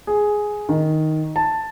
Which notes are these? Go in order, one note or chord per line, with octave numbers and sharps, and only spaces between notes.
G#4
D#3
A5